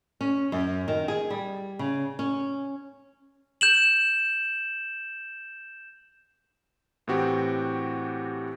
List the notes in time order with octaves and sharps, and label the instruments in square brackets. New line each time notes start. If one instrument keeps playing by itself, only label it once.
[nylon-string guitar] C#4
F#2
D#3
G#4
G3
C#3
C#4
[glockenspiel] G6 E7 F#7
[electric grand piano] A2 E3 C4 F#4 G4